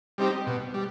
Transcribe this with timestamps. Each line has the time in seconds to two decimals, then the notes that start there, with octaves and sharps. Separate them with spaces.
0.18 G3 C4 D#4 G4
0.47 B2
0.74 G3